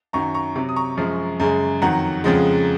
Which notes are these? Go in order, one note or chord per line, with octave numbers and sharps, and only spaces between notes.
F#2 D#3 F#3 A#5 C#6
A#5 C#6
C3 F#3
D#6
A#5 C#6
F#2 F3 G#3
F#2 C#3 G#3
F2 D#3 F#3 F#5 A#5
F2 C#3 F3 G#3